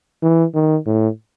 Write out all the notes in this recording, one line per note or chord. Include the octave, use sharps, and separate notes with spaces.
E3
D#3
A2